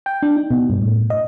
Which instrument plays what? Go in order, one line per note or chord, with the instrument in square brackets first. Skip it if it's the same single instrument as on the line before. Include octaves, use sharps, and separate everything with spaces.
[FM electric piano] G5
D4
D#4
B2
G2
A2
D#5